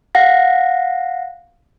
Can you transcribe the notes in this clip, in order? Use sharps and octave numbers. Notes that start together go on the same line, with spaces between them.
F5 F#5 A#6